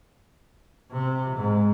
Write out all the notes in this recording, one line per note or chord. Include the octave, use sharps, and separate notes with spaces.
C3
G#2